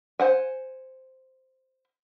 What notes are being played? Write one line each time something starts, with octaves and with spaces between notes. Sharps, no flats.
C5 F#5 G#5